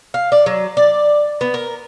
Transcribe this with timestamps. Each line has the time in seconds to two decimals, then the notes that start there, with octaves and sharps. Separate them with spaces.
0.14 F5
0.32 D5
0.46 F#3
0.77 D5
1.41 B3
1.54 A#4